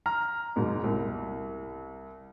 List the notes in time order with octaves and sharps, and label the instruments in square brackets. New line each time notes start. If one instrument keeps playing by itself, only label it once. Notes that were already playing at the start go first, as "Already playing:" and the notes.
[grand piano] A#5 F6
[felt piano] F#1 G#2 B2
C2